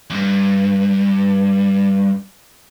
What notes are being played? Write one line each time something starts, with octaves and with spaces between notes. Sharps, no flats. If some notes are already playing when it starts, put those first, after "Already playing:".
E2 G2